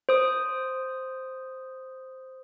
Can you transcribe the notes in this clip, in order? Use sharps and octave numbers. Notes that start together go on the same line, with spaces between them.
C5 D#6